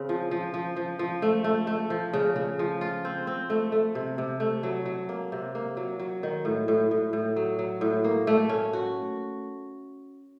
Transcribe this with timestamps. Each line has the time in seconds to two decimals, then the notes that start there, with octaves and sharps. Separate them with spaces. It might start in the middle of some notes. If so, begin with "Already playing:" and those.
Already playing: C#3 C4
0.09 F3
0.31 F3
0.54 F3
0.76 F3
0.99 F3
1.22 A3
1.44 A3
1.67 A3
1.90 F3
2.13 C#3
2.36 C#3
2.59 F3
2.81 F4
3.05 C4
3.27 C4
3.50 A3
3.72 A3
3.95 C3
4.18 C3
4.40 A3
4.63 F#3
4.85 F#3
5.09 A#3
5.32 C3
5.55 A#3
5.77 F#3
6.00 F#3
6.23 D#3
6.45 A2
6.68 A2
6.91 A2
7.13 A2
7.36 F#3
7.59 F#3
7.81 A2
8.04 A#3
8.27 A3
8.49 C#4
8.73 F#4